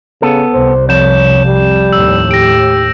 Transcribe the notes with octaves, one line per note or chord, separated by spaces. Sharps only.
C#3 B3 A4
C2 C5
F2 C#5 G6 E7
G3
D#2 A2 E6
G4 A#6 D7